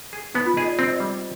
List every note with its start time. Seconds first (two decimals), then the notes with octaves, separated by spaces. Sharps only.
0.13 G#4
0.34 B3 D#4
0.46 F4
0.57 G#4 D#5
0.68 D5
0.78 C4 C5
0.88 D#5
0.93 D5
1.00 G3
1.07 D5